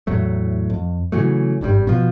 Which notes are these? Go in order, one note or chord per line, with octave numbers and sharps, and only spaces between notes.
E2 A2 F#3 A3
F2
C#3 E3 F#3 A3
G#1 G2 C#3 G3
B2 F3